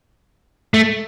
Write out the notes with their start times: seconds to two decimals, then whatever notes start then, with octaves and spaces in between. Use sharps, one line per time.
0.74 A3